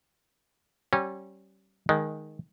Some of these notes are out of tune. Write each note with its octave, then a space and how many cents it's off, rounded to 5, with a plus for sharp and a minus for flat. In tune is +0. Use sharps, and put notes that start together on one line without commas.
G3 -30 C#4 -30
D#3 +0 G#3 +10